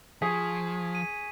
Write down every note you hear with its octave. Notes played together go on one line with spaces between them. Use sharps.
F3 G#4 C#6 G#6 B6
D#7